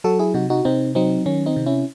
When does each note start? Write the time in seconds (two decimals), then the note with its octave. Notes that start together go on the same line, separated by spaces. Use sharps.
0.04 F#3 F#4 A4
0.19 E4 G#4
0.34 C3 D#4 F#4
0.50 D#4 F#4
0.65 C3 C4 D#4
0.95 F#3 C4 D#4
1.26 D#3 C#4
1.46 C4 D#4
1.56 C3
1.66 C#4 E4